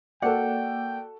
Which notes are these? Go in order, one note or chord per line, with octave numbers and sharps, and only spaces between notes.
A#3 F#4 A4 D5 F#5 G5